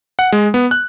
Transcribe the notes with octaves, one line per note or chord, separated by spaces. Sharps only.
F#5
G#3
B3
F#6